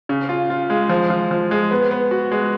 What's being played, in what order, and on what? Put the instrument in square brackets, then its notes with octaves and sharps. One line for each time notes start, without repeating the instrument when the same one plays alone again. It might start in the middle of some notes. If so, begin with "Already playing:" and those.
[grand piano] C#3
F4
F4
G#3
F3
F3
F3
G#3
B3
B3
F#4
G#3